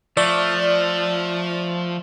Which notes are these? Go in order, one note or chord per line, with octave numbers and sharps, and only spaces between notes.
F3 A3 D5